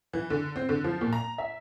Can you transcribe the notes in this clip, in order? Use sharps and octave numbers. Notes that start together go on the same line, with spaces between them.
E3
D3
C4
D3
F3
A#2
A#5
E5